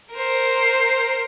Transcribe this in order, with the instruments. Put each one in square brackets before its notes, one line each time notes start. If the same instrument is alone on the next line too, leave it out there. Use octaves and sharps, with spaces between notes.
[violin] A#4 C5